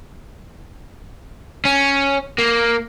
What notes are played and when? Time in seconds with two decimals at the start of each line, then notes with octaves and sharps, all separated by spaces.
1.65 C#4
2.39 A#3